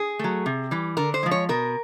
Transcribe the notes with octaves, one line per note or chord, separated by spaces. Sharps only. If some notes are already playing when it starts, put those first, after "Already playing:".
Already playing: G#4
F#3 A3
C3
E3 G3
D3 A#4
C5
F3 G#3
C#5
B2 A#4